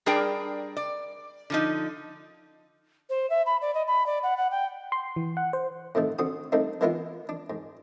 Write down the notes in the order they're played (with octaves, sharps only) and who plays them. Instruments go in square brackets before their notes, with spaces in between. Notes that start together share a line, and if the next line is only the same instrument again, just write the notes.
[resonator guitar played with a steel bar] G3 D4 G#4 A#4 D5 G5
D5
D3 F3 D#4
[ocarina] C5
E5
B5
D5
D#5
B5
D5
F#5
F#5
G5
[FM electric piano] C6
E3
F#5
C5
[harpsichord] A2 C3 D#3 A3
D3 C4 F#4 D#6
G3 A3 A#3 C4 D4 D#4
E3 G#3 A#3 B3 E4 F4
D4
G#2